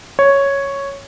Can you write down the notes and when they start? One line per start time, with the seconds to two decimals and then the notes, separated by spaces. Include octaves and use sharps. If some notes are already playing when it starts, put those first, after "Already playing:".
0.19 C#5